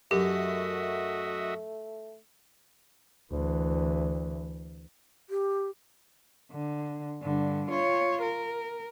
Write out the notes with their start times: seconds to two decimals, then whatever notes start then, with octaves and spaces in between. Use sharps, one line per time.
0.11 F#2 A3 F#4 G4 D#5 E5
3.31 D2 E3
5.30 G4
6.52 D3
7.22 G2 D3
7.70 F4 C#5
8.22 A#4